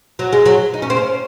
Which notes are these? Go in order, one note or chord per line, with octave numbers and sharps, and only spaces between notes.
F#3
G#3
F#3
D#4
C#4
C4
C#4